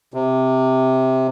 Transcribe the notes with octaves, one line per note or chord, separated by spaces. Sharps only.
C3